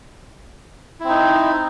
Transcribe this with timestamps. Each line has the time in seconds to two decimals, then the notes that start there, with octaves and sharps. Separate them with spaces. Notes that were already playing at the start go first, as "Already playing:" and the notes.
1.00 E4
1.04 C4
1.09 D#4